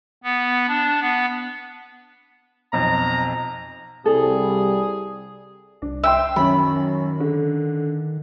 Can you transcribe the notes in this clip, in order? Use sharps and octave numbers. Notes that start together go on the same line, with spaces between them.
B3
D4
B3
B1 F2 A#5
C2 G3 G#4 A4
C2 D4
E5 G5 C6 E6
F#2 D#3 C#4 B5
D3